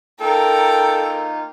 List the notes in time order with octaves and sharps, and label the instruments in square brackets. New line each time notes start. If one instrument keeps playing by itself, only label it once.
[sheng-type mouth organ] A#3 D#4 F4 [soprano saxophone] A4 [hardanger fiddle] A#4 G5